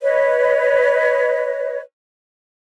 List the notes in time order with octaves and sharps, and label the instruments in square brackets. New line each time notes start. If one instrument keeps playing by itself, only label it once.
[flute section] B4 C#5 D#5